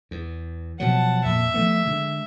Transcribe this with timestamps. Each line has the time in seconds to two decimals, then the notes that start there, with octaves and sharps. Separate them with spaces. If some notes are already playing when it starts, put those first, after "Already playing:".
0.11 E2
0.80 B2 F3 F#3 F#5 A5
1.25 F2 A#2 E5
1.54 F3 A3 B3
1.85 D3 G#3